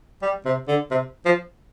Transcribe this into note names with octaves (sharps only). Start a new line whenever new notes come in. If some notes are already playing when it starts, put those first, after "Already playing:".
G3
C3
D3
C3
F3